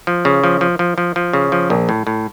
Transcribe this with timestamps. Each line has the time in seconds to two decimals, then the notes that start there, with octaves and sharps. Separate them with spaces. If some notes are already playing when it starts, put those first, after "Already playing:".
0.07 F3
0.25 C#3
0.44 F3
0.61 F3
0.79 F3
0.98 F3
1.16 F3
1.33 C#3
1.52 F3
1.70 A#1
1.89 A2
2.07 A2